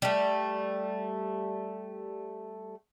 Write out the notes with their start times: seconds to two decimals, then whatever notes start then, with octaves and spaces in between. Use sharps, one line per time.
0.02 G3 A3